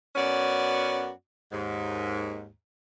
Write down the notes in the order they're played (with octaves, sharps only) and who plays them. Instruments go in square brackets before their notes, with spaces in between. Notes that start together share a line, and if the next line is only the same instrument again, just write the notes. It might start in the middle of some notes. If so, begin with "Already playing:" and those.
[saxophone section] F#2 B3 C#4 F#4 D5
D#2 G#2